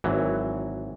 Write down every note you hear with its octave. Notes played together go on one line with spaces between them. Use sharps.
G#1 E3 F#3